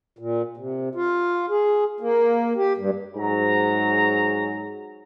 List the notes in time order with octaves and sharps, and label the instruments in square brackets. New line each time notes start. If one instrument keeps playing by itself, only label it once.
[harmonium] A#2
C3
F4
G#4
A#3
G4
G2
[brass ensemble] G#2 F#3 G#4 A#5